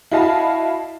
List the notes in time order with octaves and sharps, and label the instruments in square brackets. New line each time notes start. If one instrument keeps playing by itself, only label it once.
[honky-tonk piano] E4 F#4 D#5 F5 A5 B5